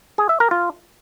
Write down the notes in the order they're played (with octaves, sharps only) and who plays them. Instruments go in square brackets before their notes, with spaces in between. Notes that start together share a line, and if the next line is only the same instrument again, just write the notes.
[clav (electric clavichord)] G#4
E5
A#4
F4